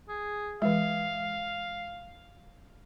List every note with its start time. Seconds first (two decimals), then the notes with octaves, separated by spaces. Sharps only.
0.09 G#4
0.62 E3 G#3 F5